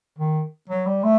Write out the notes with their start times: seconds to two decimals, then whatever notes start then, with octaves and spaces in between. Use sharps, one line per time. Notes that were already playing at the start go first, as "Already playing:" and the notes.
0.18 D#3
0.69 F#3
0.86 G3
1.03 A3